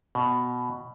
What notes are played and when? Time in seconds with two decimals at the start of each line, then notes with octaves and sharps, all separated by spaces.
0.15 B2